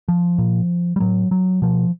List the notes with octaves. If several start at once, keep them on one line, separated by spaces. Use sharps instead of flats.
F3
A#2
G3
A2 F#3
F#3
B2 F3